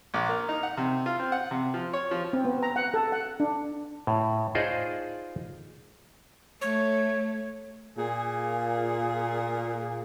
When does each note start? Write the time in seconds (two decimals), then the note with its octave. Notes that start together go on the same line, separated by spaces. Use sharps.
0.14 A#1
0.29 A#4
0.49 D#4
0.63 F#5
0.77 C3
1.06 F4
1.19 C4
1.32 F#5
1.51 C3
1.74 F3
1.93 C#5
2.11 F3
2.33 C4
2.45 B3
2.63 A#5
2.76 F#5
2.94 A4
3.12 F#5
3.40 D4
4.07 A2
4.55 D#4 F4 G#4 C5 D5 D#5
6.61 A3 C#5
7.97 A#2 G#4